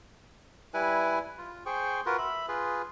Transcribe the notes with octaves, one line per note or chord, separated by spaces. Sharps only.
G3 E4 B4 G#5
F4
G#4 C5 G5 C#6
F4 F#4 A#4 B4
E5 B5
F4 G#4 B4